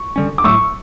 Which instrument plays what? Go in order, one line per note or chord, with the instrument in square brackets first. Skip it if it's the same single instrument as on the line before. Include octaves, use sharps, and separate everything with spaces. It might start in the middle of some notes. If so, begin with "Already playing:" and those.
Already playing: [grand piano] C#6
[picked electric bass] D3 G3 C#4
[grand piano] D6
[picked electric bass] A2 F#3 A3 [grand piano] C#6 E6